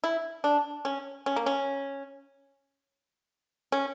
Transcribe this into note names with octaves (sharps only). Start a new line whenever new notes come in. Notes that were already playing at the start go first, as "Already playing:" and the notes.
E4
D4
C#4
C#4
A#3
C#4
C#4